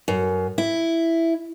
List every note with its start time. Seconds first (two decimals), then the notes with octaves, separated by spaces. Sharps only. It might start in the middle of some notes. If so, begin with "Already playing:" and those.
0.08 F#2
0.58 E4